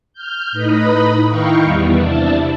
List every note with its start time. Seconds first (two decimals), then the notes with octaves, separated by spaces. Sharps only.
0.13 F6 G6
0.52 A2 D#4 B4 D#5 B5
1.27 D#3 D#4 E4 F5 G5 C#6
1.63 E2 G3 B3
1.97 C3 D4 E4 A5